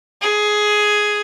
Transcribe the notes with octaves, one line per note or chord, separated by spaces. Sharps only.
G#4